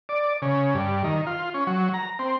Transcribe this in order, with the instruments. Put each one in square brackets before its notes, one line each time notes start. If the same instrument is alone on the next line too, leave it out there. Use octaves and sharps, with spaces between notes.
[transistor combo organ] D5
C#3
G2
D#3
F4
C#4
F#3
A#5
C4